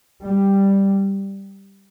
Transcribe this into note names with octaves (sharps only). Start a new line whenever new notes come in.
G3